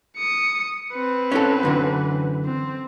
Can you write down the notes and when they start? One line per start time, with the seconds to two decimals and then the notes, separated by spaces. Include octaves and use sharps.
0.17 D#6 C#7
0.93 C4 B4
1.32 C#4 E4 A4
1.63 F#2 D3 E3
2.45 C4